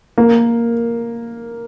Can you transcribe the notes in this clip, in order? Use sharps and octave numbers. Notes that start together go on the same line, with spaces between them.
A#3